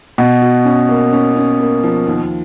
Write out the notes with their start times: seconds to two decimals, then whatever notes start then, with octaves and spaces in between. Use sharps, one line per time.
0.18 B2 F#4
0.42 F#4
0.65 C#4
0.89 A#3
1.13 C#4
1.36 C#4
1.60 A#3
1.83 F3
2.07 D#2